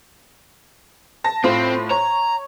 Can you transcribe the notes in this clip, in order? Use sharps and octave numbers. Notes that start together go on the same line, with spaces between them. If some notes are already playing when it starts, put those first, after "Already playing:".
A5 A#6
A2 C4 F4 C5
C#5 A#5